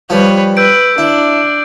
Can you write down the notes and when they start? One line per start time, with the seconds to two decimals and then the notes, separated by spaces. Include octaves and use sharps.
0.10 F3 G3 B4 C#5
0.57 B4 E6 G6 D7
0.98 D4 E4